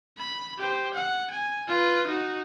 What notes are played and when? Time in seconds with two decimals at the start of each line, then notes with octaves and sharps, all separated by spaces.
0.18 B5
0.58 G4 C5
0.94 F#5
1.31 G#5
1.68 F4 B4
2.07 D#4 F#4